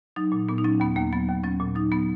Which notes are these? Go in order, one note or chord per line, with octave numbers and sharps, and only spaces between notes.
F#3 D#4
A#2
A#2 B3
D#4
F#3 C#4
D#2 B3
D#2 A#3
F#3 B3
D#2
F#3 C#4
A#2
F#3 D#4
F#3 B3